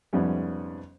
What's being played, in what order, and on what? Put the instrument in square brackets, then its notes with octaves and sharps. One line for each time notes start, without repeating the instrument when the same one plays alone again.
[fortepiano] F2 G#2 C3 G3 B3 C#4